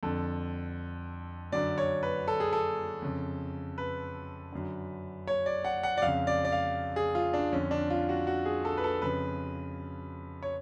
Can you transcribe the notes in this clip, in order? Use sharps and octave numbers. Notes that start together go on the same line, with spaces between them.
F2 D3 A4
F#2 D3 D5
C#5
B4
A4
G#4
A4
F2 C#3
B4
F#2 D3
C#5
D5
F#5
F#5
D5
F2 C#3 F5
D5
D5
F5
G#4
F4
D4
F2 D3 C#4
D4
F4
F#4
F#4
G#4
A4
B4
A4
F2 C#3 B4
C#5